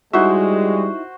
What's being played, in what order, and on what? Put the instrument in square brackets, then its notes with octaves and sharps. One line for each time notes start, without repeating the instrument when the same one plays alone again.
[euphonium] G3 [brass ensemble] G#3 [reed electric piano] D#4 E4 E5 [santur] F#4 C5